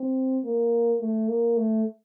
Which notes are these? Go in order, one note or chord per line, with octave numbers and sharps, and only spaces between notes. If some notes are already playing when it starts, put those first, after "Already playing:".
Already playing: C4
A#3
A3
A#3
A3